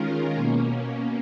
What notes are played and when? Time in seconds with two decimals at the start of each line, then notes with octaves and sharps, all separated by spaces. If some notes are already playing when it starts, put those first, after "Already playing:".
Already playing: D#3 G#3 C#4 F4 A#4
0.35 B2 A#3 C#4